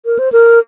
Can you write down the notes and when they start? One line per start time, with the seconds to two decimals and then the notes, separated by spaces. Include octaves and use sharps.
0.06 A#4
0.19 C5
0.32 A#4